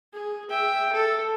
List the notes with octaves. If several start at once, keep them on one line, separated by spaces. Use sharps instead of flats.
G#4
E5 G5
A4